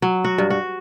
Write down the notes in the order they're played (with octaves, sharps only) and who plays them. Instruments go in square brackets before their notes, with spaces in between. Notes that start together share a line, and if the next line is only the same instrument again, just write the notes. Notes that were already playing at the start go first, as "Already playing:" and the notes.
[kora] F#3
F#4
G2
F#4